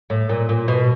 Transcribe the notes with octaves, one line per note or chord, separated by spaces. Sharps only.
A2
A#2
A#2
B2